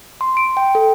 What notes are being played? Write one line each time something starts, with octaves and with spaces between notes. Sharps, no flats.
C6
D7
G5
A4